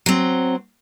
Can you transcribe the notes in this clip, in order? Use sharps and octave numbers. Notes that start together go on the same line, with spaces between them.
F#3 C4